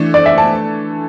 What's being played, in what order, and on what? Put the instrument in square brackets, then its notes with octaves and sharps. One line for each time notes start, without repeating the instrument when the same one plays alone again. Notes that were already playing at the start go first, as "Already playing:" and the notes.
Already playing: [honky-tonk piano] E3 A3 D4
[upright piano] D5
E5
A5